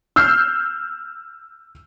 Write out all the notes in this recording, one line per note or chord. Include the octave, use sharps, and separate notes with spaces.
E6 F6 G6 C7